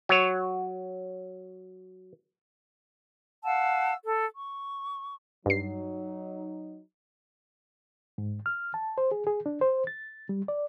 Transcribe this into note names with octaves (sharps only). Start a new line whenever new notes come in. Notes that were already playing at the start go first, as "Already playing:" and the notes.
F#3 C#5
F5 F#5 A5 E6
A4
C#6
G2 F#3 D#4 C7
G#2
F6
A5
C5
G#4
G#4
D4
C5
A6
G3
D5